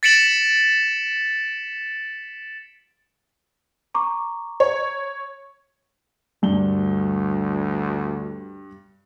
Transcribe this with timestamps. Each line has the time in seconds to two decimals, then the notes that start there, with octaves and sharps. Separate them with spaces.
0.03 A6 B6 C#7 D7 E7 F#7
3.95 A#5 C#6 D6
4.60 C#5
6.43 D2 G2 G7